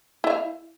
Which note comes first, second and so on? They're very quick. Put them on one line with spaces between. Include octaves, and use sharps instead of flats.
E4 E5 F5